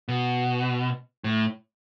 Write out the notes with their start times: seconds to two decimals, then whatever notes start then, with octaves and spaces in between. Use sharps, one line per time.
0.08 B2
1.24 A2